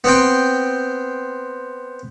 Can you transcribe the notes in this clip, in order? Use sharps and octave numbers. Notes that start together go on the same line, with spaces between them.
B3 C4 G5